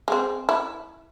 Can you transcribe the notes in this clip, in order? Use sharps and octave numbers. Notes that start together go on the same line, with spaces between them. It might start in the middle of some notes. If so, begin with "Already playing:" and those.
G#3 C4
E4